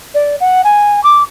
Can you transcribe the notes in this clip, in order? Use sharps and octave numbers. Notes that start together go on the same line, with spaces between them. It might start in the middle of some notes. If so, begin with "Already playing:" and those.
D5
F#5
G#5
D6